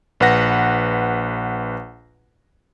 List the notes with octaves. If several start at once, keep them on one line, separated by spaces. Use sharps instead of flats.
A#1 B4 F#5 A#6